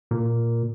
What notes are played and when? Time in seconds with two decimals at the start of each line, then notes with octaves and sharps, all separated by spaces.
0.11 A#2